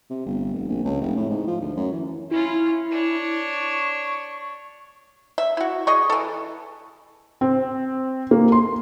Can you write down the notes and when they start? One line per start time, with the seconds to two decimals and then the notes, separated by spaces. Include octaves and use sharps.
0.10 C3
0.26 G1
0.54 F1
0.68 A#1
0.84 C#2
1.01 F1
1.16 A2
1.29 G#2
1.47 F3
1.61 D2
1.77 F#2
1.92 E3
2.31 C#4 E4 F4
2.91 D4 C#5
3.53 C#6
5.38 E5
5.57 E4 F#4
5.87 G#4 D#5 C#6
6.10 E3 A4
7.41 C4
8.31 A#3
8.52 C6